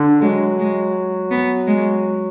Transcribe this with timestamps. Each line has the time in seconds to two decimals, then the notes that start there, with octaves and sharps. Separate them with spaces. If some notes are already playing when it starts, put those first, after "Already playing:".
Already playing: D3
0.22 F#3 G#3
0.59 G#3
1.31 B3
1.67 G#3